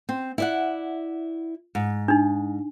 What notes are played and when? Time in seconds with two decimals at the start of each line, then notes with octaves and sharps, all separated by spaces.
0.09 C4
0.38 E4 D5 F#5
1.75 G#2
2.08 D4 D#4